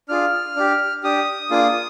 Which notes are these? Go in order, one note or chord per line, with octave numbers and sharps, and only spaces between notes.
D4 F4 G#4 F6
D4 G4
D4 G4 D#6
A#3 D4 F4 G#4